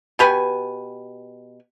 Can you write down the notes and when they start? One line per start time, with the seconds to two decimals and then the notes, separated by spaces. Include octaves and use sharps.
0.19 B2 G4 B4 G#5